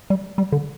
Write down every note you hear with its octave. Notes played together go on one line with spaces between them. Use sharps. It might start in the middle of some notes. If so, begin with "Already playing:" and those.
G3
G3
D3